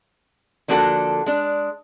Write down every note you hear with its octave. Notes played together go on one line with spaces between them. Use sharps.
D3 F3 A#3 D4 F#4 A4
G#3 D4